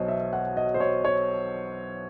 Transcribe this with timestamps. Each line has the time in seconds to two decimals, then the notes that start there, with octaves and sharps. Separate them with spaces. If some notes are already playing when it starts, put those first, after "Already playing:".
Already playing: B1 B2 F#3 C5 C#5 D#5
0.08 E5
0.33 F#5
0.57 D#5
0.74 C5
0.80 C#5
1.05 C#5